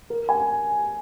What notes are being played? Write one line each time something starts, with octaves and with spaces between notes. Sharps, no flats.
A#4
G#5